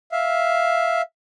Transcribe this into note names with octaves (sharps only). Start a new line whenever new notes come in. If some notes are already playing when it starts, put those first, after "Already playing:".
E5 F5